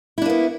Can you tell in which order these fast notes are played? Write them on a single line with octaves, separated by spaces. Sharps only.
E4 D4 A#3 B3